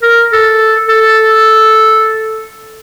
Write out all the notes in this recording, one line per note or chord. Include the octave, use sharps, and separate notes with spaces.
A#4
A4
A4